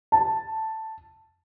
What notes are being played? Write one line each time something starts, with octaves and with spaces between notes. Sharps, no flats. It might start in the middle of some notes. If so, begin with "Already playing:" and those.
A5